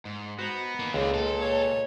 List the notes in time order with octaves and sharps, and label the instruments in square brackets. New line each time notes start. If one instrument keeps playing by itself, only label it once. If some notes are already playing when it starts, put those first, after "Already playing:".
[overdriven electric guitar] G#2
[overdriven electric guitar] B3 [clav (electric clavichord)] F#4 C5 A#5
[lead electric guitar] A#3 D#4
[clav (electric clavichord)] C#2 [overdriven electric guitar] D3 C4
[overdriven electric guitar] A#2 [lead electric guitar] A4
[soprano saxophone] C#5